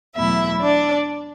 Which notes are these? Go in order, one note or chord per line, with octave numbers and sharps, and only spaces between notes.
E2 B2 F#3 A3 E4 E5
D4 D5